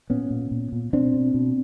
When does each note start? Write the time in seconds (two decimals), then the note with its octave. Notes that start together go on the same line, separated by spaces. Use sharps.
0.10 A#2 B3 C#4
0.30 A#2
0.51 A#2
0.72 A#2
0.93 B2 C4 D4
1.14 B2
1.34 B2